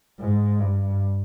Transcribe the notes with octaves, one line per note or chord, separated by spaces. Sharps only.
G#2
G2